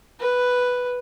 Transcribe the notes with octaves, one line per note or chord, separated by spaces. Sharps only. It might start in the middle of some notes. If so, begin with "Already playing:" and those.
B4